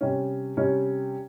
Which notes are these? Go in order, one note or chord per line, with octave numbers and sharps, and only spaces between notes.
C3 G3 C#4
C3 G3 C#4